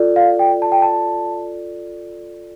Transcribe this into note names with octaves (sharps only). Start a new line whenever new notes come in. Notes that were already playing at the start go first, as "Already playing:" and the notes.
Already playing: F4 A4 D5
F5
G5
A5
G5
A5